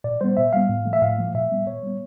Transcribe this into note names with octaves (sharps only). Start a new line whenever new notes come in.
A#2 D5
G3 B3 C5
A#2 E5
G3 B3 F5
A2
F3 A3
E5
A2 F5
F3 A3
A#2 E5
G3 B3
A#2 C#5
G3 B3